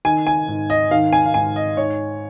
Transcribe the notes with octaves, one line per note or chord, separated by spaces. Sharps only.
D#3 G#5
G#5
G#2
D#5
D#3 F5
G#5
F5
G#2 G#5
D#5
G#2 C#5